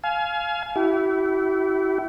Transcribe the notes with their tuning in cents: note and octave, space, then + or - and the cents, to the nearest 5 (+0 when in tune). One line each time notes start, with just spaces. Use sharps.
F5 -5 G#5 +35
E4 +0 G4 -45